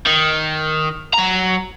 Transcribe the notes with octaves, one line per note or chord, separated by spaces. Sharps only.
D#3
F#3 A#5